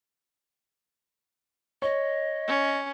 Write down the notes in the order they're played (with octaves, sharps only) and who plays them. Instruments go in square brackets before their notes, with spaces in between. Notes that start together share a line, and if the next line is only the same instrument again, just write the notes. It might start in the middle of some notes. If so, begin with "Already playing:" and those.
[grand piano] C#5 [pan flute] D#5
[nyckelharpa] C#4